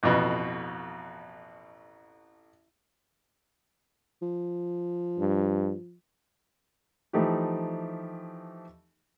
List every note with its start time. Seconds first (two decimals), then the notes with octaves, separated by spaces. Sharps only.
0.03 A1 F2 B2
4.22 F3
5.19 G2
7.13 E3 F3 A3 D#4 G4